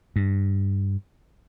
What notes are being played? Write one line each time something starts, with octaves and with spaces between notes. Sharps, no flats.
G2